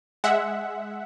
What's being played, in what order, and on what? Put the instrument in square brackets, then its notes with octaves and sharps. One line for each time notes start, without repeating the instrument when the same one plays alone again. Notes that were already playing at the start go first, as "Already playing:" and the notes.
[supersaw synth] G#3 E5 F#5